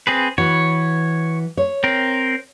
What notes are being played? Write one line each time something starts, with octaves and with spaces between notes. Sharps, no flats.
C4 G#4 B4
E3 F#4 C#5
C#5
C4 A#4